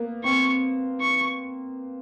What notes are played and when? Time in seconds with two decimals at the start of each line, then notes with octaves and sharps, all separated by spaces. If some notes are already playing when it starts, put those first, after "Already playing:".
Already playing: A#3 B3
0.24 C4 C#6
1.00 C#6